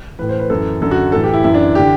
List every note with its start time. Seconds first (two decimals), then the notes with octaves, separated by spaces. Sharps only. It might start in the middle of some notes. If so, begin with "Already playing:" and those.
0.19 A2 E3 B4
0.29 C5
0.40 B4
0.50 F#2 E3 A4
0.81 F#2 D3 A4
0.91 F#4
1.12 A2 E3 A4
1.24 G4
1.34 E4
1.44 F#2 E3 E4
1.54 D4
1.75 D3 G4